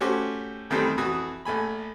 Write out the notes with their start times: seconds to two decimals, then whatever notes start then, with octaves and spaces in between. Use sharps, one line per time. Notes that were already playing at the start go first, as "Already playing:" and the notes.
0.01 A3 C#4 F#4 G4 C5
0.70 F2 D#3 E3 G3 A3 C4
0.98 F2 E3 F#4 B5 D#6
1.45 A#1 A3 G#5 B5